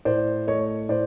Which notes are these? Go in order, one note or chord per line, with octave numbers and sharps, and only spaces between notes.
A2 C5 D5
A3 C#5 D#5
A2 C5 D5